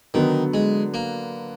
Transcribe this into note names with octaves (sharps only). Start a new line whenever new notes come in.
D3 D#3 F#3 B3
G#3
A#3